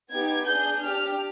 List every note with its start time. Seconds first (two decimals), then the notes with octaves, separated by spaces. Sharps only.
0.11 B3 D#4 G4 G#6
0.47 D4 G#4 G6
0.83 D4 G4 F6